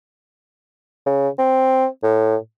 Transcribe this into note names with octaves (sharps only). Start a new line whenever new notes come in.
C#3
C4
A2